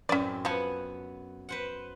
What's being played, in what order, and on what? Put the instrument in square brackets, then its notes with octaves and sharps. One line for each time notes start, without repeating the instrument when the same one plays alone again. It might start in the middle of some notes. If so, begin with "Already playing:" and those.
[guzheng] F#2 A2 C4 [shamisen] C#4 D5
[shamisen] F3 A5 [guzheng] B3 F#5 G#5
[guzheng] B4 C5 F#5